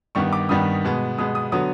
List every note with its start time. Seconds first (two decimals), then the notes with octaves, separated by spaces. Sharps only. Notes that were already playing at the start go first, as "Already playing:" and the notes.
0.15 G2 D#3 G3 B3 C#6
0.33 D6
0.49 G2 D#3 G3 B3 D#6
0.84 B2 G#3 B3
1.18 B2 G#3 B3 D#6
1.35 D#6
1.52 D3 F#3 B3 D#6